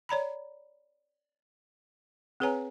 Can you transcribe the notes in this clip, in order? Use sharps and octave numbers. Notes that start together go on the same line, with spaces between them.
C#5 D5 A#5 B5
C4 G#4 B4 C#5 G#5 A#5